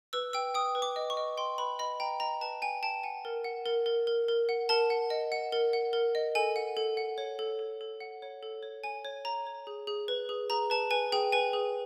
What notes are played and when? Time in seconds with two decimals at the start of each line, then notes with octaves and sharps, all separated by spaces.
0.13 B4 E6
0.33 G5 E6
0.54 G5 D#6
0.75 B4
0.82 D6
0.96 D#5
1.10 C#6
1.17 D#5
1.37 G5 C6
1.58 B4 B5
1.79 D#5 B5
2.00 G5 A#5
2.20 D#5 A#5
2.41 B4 A5
2.62 G5 G#5
2.83 G5 A5
3.03 F#5 G#5
3.25 A#4
3.44 F#5
3.66 A#4
3.86 A#4
4.07 A#4
4.28 A#4
4.49 F#5
4.69 A#4 A5
4.90 F#5
5.10 D#5
5.32 F#5
5.52 A#4
5.73 F#5
5.93 A#4
6.15 D#5
6.35 A4 G#5
6.56 F#5
6.77 A4
6.97 F#5
7.18 C#5
7.39 A4
7.59 A4
7.81 A4
8.00 F#5
8.22 C#5
8.42 A4
8.63 C#5
8.84 C#5 G#5
9.05 C#5
9.25 C#5 A#5
9.47 C#5
9.67 G#4
9.87 G#4
10.08 B4
10.29 G#4
10.50 G#4 A#5
10.70 B4 A5
10.91 B4 G#5
11.12 G#4 G5
11.32 B4 G#5
11.53 G#4